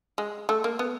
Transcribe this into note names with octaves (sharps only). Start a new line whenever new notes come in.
G#3
A3
A#3
B3